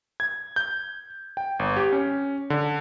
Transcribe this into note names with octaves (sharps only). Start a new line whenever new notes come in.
G#6
G6
G5
G1
G4
C#4
D3